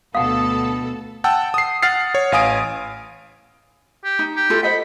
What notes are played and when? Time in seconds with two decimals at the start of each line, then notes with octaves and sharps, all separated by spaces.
0.15 D2 B2 A4 F5 F#5 D#6
1.24 F#5 G5 A5 E6
1.54 D#6 C7
1.82 F#5 F6 A6 C7
2.15 C#5
2.32 A1 F5 G#5 D#6 D7
4.05 G4
4.19 D#4
4.36 G4
4.50 E4 F4 A4
4.63 C5 D#5 F#5 B5